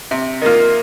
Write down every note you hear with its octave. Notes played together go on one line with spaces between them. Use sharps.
C3
D#3 A#3 F4